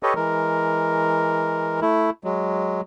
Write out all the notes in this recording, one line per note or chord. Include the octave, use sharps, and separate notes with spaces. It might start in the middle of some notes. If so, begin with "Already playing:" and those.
G4 A4 B4 C#5 D#5
E3 G#3 A#4
A3 E4
F#3 G#3